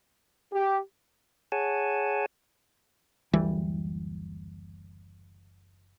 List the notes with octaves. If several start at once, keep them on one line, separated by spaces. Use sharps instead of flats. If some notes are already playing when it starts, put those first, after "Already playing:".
G4
G#4 C#5 F#5 G#5 A5
F#1 D2 E3 G3